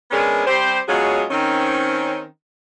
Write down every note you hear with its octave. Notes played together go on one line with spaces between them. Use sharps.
G#3 B3 C#4 D4 G#4 A#4
G3 C4 G4 C5
B2 F#3 G#3 C#4 F4 G#4
D#3 C4 C#4